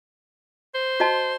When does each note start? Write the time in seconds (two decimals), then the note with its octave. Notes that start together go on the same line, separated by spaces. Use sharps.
0.74 C5
1.00 F#4 D#5 A5